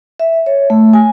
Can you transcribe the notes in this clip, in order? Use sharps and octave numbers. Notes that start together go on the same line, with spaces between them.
E5
C#5
A3
G#5